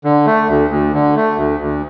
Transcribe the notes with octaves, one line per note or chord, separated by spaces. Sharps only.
D3
A3
D2
D2
D3
A3
D2
D2